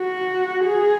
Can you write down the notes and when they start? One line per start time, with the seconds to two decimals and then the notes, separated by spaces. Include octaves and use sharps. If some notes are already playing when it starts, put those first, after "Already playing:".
Already playing: F#4
0.65 G#4